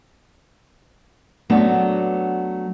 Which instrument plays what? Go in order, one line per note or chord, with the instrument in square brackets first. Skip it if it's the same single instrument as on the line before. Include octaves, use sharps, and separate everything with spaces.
[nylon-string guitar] F#3 A3 B3 D4